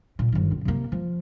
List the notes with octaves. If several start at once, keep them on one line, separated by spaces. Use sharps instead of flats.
A#2
G1 D#3
C#2
C3 A#3
F3